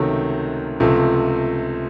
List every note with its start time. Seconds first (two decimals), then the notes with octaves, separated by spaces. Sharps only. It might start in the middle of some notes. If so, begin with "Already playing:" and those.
Already playing: C#2 C3 D#3 F#3 A3
0.80 C#2 C3 F3 A3